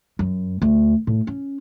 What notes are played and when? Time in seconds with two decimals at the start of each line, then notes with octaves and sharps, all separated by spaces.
0.19 F#2
0.62 D2
1.07 A2
1.27 C#4